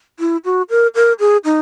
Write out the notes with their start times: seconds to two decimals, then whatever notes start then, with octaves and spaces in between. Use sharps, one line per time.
0.19 E4
0.45 F#4
0.70 A#4
0.95 A#4
1.20 G#4
1.45 D#4